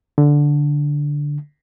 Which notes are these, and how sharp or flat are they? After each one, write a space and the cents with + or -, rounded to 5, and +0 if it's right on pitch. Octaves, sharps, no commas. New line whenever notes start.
D3 -5